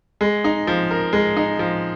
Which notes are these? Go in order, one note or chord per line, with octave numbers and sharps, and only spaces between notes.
G#3
D#4
F3
A#4
G#3
D#4
F3